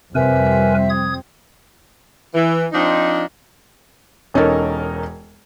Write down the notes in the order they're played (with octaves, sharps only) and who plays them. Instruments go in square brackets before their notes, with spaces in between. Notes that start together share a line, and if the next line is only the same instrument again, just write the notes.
[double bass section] F2 G3 C4 [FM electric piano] C3 [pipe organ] A#4 B4 G#5 [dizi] E5
[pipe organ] D#6 G#6
[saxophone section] E3
F3 C4 D4 D#4
[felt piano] E1 C#4 D#4 A4 A#4